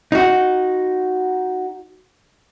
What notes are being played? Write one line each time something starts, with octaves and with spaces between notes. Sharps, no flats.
D#4 F#4